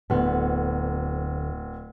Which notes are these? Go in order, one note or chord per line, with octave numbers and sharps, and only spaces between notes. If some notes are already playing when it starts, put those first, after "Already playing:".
D1 D2 B3